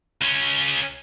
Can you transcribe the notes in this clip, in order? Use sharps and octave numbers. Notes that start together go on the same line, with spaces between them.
C#2 C#4